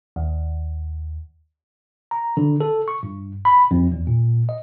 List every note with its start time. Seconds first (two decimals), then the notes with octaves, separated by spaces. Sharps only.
0.16 D#2
2.11 A#5
2.37 D3
2.61 A4
2.88 C#6
3.03 G2
3.45 B5
3.71 F2
3.92 E2
4.07 A#2
4.49 D#5